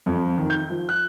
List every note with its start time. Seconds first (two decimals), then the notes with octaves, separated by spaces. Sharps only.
0.06 F2
0.37 D#3
0.50 G6
0.70 F3
0.89 F#6